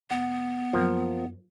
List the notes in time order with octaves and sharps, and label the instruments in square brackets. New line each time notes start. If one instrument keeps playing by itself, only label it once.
[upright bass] F1 [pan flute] B3 [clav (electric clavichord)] F#5
[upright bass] F#2 F#3 [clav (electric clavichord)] F3 A#3